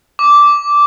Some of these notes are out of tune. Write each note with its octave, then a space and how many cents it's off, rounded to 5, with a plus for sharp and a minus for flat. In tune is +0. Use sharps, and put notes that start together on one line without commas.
D6 -10